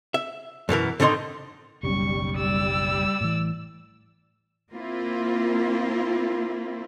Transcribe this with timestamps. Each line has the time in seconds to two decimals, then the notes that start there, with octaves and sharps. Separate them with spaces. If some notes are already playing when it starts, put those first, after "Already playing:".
0.14 E5
0.69 F#2 B2 E3 A#4
1.00 A2 D3 D#3 D#4 D#5 C6
1.83 F#1 B1 G3 C#4 C#6
2.36 D5 E6
3.21 A2 E3
4.73 A#3 C4 E4 F4